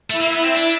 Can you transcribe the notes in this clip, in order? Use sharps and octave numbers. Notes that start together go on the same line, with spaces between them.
A3 E4 E5
A#3
B3
C4
D4